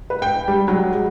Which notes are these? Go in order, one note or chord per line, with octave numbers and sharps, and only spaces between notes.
B4
G5
G3
F#3
G#3